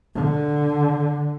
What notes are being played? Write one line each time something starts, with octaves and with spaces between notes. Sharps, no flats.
D3